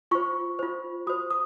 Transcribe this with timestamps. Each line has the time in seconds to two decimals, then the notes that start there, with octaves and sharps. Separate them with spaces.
0.11 F4 C5 C#6
0.59 F4 C5
1.07 F#4 C5 D#6
1.31 D#6